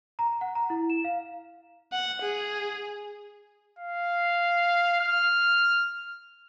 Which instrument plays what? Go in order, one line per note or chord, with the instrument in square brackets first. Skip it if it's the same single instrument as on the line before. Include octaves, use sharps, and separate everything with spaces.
[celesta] A#5
F#5
A#5
E4
E7
F5
[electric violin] F#5
G#4
[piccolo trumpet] F5
F6